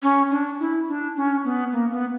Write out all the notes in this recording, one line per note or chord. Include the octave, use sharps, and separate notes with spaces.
C#4
D4
E4
D4
C#4
B3
A#3
B3